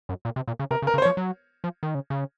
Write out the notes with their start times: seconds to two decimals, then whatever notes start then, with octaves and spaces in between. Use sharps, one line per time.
0.09 F#2
0.25 A#2
0.36 C3
0.48 A#2
0.59 C#3
0.71 C3 A#4
0.82 C#3
0.87 A#4
0.94 C#3
0.98 C5
1.02 C#5
1.05 F3
1.17 F#3
1.64 F3
1.83 D#3
1.95 C#3
2.10 C#3